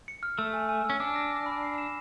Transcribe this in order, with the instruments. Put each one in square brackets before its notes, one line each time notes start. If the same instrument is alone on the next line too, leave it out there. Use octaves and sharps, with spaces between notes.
[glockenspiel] C#7
F6
[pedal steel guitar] A3 [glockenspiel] E6
[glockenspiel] G#5
G#5
E6
[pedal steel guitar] C#4
[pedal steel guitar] D4 [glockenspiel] D6
[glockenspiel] A#6
A#6
B5
C7
E7